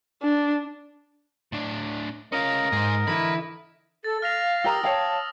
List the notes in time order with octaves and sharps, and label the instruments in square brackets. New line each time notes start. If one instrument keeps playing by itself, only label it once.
[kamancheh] D4
[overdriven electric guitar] A2 D4
[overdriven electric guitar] C#4 F4 [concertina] A#4 D#5
[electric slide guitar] G#2 [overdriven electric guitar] G#4 C5
[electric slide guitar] D3 E3 E4 [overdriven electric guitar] B4
[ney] A4 [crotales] A6
[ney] F5 [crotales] F6 A#6 F7
[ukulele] G4 A#4 A#5 [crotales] D#6 E6
[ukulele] C#5 F5 G5 [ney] A5